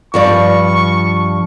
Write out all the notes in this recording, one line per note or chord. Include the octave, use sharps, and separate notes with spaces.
G2 F3 D5 C#6